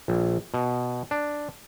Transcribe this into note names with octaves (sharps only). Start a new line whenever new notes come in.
A#1
B2
D4